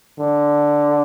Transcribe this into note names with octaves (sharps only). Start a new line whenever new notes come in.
D3